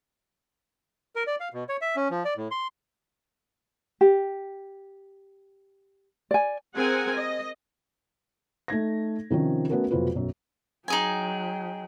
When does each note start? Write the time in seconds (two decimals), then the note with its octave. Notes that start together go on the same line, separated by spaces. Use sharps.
1.16 A#4
1.27 D5
1.40 F5
1.53 B2
1.69 C#5
1.81 E5
1.96 C#4
2.10 F3
2.25 D5
2.37 A2
2.51 C6
4.01 G4
6.31 D5 G#5
6.76 C4 G#4 A#4 F#5 G#5
7.16 D#5
8.68 A3 D#4 G#6 A#6
9.30 C3 D#3 F3 C#4
9.70 A3 B3 C#4 F#4 A4 A#4
9.91 F1 F2 B2 F#3 F4 B4
10.15 B1 F#2
10.88 F#3 D#4 G#4 G5 G#5